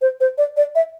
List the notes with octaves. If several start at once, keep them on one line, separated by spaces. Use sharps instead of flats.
C5
C5
D5
D5
E5